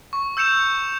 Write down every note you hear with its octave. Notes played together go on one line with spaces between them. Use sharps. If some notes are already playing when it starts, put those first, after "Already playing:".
C#6
E6 G6 C#7 E7 F7